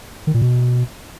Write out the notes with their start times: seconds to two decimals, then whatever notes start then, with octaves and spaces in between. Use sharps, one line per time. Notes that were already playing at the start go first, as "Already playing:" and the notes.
0.27 D#3
0.34 A#2
0.42 B2